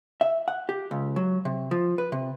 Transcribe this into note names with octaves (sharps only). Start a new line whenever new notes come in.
E5
F#5
G4
C#2
F#3
C3
F3
B4
C3